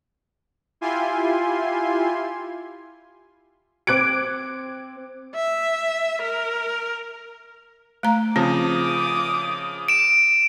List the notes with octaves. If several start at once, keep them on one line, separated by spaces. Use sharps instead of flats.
E4 F4 G4 G#5 C6
C4 D6 F#6 G#6 D7
E5
A#4
A3 A#5
C#3 F3 C4 D6 D#6
D7 E7